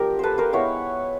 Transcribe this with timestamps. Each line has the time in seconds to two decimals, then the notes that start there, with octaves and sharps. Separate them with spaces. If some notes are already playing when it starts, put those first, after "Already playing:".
Already playing: F3 B3 D4 G4 A#4
0.19 A4 B4 C5
0.38 A#4 C5
0.53 G#3 B3 E4 B4 C#5